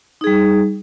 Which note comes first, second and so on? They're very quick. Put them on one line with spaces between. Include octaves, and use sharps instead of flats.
D#4 G#4 G3